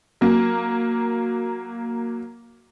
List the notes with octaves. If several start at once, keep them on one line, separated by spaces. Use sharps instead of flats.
F#3 A#3